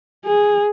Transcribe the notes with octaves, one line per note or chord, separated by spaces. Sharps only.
G#4